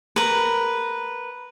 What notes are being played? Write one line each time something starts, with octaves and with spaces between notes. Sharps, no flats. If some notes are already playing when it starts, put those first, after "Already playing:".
A#4 B4